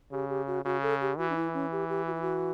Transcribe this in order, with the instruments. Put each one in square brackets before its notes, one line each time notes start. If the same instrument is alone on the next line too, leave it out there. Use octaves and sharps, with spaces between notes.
[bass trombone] C#3 [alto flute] G4
[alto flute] G4
F#4
[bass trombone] C#3 [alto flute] F#4
[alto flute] A4
G4
[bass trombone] E3 [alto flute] F#4
[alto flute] D4
E4
C#4
G4
G4
F#4
E4
F#4